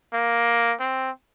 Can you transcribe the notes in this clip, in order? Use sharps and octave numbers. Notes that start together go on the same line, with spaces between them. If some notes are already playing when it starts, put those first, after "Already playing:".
A#3
C4